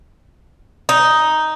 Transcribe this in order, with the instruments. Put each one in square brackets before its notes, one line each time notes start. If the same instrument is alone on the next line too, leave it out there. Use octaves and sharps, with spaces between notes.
[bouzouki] D#4